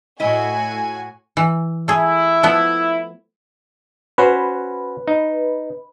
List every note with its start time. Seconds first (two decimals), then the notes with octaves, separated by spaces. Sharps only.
0.20 A2 E4 F#4 D#5 G#5
1.37 E3
1.88 A3 E4 G#4
2.43 F3 A3 B3
4.18 C#4 F#4 B4 C5
5.08 D#4